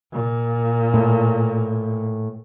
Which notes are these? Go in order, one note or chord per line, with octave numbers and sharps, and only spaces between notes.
A#2
A2